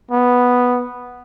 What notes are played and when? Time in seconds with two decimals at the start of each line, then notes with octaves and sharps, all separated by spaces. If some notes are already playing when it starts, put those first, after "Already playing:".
0.11 B3